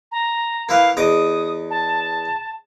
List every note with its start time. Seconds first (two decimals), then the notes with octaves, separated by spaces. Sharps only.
0.12 A#5
0.69 A#3 E4 B4 F5
0.97 E2 D#5 D6 D#6
1.70 A5